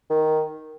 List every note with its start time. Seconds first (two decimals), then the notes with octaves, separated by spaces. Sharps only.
0.10 D#3